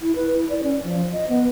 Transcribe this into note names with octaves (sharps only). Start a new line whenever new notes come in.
E4
B4
E4
D5
C#4
F3
D#5
B3